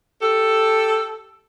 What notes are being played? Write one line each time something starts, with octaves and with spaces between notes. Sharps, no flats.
G4 A4